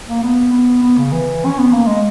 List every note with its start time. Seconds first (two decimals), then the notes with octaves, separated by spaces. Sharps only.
0.09 A#3
0.23 B3
0.53 B3
0.82 B3
0.97 C#3
1.12 E3
1.45 C#4
1.59 B3
1.73 A#3
1.87 G#3